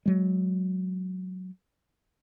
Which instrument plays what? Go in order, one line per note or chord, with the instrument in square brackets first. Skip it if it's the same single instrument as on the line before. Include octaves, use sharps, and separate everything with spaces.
[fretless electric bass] F#3 G#3